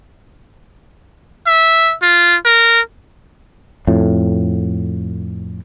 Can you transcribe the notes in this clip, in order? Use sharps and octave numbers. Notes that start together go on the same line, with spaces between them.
E5
F4
A#4
F2 A2